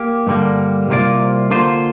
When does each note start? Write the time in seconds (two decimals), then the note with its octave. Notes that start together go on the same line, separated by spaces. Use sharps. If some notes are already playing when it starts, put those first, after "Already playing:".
Already playing: A#3 G4
0.27 G2 D3 G3 A#3
0.89 C2 C3 A#3 F4 D5
1.50 D3 A#3 F4 C5